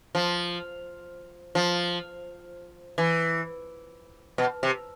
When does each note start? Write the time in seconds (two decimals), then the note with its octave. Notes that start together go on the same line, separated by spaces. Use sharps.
0.15 F3
1.55 F3
2.98 E3
4.38 B2
4.63 C3